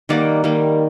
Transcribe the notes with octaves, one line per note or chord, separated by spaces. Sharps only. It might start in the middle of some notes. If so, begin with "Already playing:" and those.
D#3 G3 A#3 D5 F#5
D#3 G3 A#3